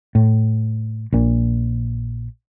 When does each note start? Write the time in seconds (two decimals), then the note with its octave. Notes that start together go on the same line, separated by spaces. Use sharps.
0.15 A2
1.12 A#1 A#2